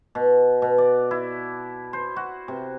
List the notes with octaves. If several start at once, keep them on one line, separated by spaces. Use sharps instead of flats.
B2
B2
D5
E4
C5
F#4
C3